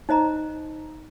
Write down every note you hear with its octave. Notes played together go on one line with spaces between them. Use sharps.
D#4 C5 D#5 A#5